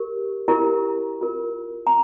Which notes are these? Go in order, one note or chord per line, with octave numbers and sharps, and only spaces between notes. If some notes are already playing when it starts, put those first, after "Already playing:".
Already playing: G4 A#4
E4 G4 A#4
F4 A#4
A#5